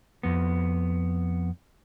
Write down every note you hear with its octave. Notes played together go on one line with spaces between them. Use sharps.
F2 B3